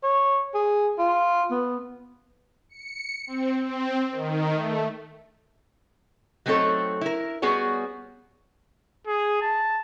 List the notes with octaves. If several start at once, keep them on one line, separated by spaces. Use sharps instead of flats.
C#5
G#4
F4
B3
C#7
C4
C4
D#3
A3
F#3 A3 C4 D#4 A4 C#5
E4 A#4
G3 B3 F#4 G#4 C#5
G#4
A5